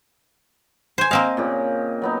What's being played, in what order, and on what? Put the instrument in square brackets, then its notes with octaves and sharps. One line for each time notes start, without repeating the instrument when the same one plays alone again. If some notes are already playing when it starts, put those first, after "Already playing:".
[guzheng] C5 G#5
[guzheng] A#3 C4 F5 [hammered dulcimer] D#5
[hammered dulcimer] A#2 C#3 G4
F#3 B3 D#4